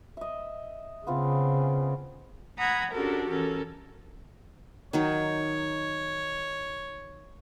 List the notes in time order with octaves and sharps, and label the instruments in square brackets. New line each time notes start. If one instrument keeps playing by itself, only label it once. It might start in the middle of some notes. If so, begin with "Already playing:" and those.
[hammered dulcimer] D#5 E5
[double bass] C#3 [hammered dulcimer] B3 C4 F4
[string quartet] F#5 A#5 B5 D#6 G#6
C#4 D4 F#4 G4 A4 A#4
E3 C#4 A4 A#4
[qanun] D#3 F#3 D#4 [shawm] C#5